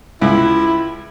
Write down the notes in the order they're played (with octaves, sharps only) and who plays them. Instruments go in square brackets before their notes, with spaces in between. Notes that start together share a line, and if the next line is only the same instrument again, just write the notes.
[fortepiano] C#2 [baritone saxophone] E4